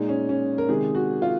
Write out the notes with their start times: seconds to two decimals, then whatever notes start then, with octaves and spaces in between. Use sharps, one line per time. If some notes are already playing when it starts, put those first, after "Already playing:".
Already playing: A#2 G#3 D#4
0.09 C#4
0.29 C#4
0.58 A#4
0.68 C3 D#3 G#3 G#4
0.95 F#4
1.22 F4